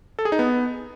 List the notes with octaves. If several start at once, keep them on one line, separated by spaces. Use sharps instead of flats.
A4
G#4
D#4
B3